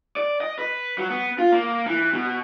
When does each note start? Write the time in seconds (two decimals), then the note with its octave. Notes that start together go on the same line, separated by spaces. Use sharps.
0.17 D5
0.41 D#5
0.59 B4
0.98 F#3
1.10 B3
1.38 F4
1.52 A#3
1.86 E3
2.13 B2